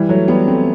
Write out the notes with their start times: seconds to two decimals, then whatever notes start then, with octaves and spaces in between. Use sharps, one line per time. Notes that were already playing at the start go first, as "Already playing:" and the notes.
Already playing: E3 G3
0.09 F#3 A3
0.28 G3 B3
0.47 A3 C4